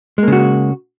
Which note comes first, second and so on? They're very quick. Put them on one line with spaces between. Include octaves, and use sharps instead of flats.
G#3 A#3 C#3 F#4